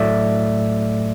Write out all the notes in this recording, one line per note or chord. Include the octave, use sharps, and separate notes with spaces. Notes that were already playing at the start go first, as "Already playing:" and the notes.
Already playing: A2 F#3 A3 D5 E5